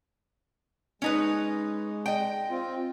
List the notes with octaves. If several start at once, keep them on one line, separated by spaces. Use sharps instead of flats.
G#3 C#4 D#4 B4
D#5 G5
C4 F4